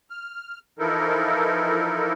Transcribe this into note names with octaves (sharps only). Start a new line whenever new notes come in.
F6
E3 F3 D#4 E4 A4 A#4